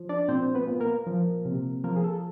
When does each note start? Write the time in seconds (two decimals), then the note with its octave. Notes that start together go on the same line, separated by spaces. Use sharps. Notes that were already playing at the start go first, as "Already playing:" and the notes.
Already playing: F3
0.09 D4 D5
0.28 A#2 C4 C5
0.55 B3 B4
0.67 A#2
0.80 A#3 A#4
1.07 F3
1.45 C3
1.84 F3 A#3 A#4
1.96 G#4
2.04 A4